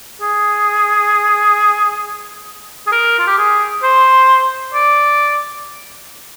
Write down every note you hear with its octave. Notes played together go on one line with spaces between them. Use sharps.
G#4
G#4
A#4
F4
G4
G#4
C5
D5